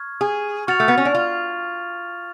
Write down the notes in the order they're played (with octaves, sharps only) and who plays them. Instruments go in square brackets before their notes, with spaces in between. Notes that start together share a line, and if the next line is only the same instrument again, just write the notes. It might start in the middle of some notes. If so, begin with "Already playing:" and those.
Already playing: [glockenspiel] C#6 F6 G#6
[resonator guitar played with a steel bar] G#4
[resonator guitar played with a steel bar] F#4 [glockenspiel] C#6 F6 A6 F7
[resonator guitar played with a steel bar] A3
B3
C#4
D4
F4